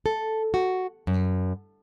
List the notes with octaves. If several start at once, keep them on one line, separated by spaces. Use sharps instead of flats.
A4
F#4
F#2